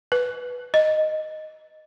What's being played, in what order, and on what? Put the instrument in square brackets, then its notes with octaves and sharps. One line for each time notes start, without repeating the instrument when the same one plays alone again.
[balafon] B4
D#5